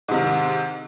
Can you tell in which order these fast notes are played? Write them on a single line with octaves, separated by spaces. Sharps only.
G#2 C3 D#3